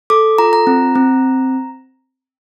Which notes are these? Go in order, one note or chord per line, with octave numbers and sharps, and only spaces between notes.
A4 D6
F4 A#5
A#5
C4
C4